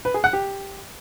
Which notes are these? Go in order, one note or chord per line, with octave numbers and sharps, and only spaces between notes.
B4
G#4
F#5
G4